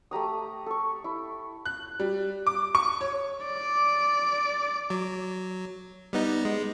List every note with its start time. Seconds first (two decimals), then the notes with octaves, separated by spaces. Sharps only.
0.11 A3 G4 A#5 D#6
0.66 A4 C#6
1.04 E4
1.65 F#6
2.00 G3
2.47 D6
2.75 C#6
3.01 C#5
3.46 D5
4.90 F#3
6.13 G3 B3 D#4
6.45 G#3